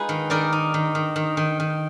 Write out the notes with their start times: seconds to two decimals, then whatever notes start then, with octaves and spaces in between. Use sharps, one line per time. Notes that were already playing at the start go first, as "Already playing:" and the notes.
Already playing: G#3 D#4 F4 G#4 B4
0.09 D#3
0.30 D#3 A#4 D5
0.53 D#4
0.74 D#3
0.95 D#3
1.16 D#3
1.37 D#3
1.60 D#3